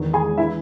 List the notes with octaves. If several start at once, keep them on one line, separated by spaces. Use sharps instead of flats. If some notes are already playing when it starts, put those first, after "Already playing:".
Already playing: E2 D#3
G#4 G#5
E3 E4 E5